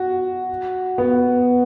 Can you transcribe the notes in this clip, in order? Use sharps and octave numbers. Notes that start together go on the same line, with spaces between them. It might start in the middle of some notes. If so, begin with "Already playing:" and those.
Already playing: F#4
B3